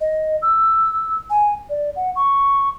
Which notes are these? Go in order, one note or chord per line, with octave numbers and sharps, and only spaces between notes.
D#5
E6
G#5
D5
F#5
C#6